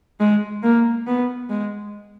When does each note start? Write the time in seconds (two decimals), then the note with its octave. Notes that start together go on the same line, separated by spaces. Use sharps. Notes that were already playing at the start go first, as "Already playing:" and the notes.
0.20 G#3
0.63 A#3
1.07 B3
1.50 G#3